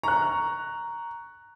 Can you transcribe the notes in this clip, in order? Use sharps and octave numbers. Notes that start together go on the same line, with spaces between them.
A#5 C#6 F#6